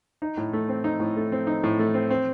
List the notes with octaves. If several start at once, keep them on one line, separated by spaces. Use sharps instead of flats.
D#4
A2
A3
C4
D#4
A2
A3
C4
D#4
A2
A3
C4
C4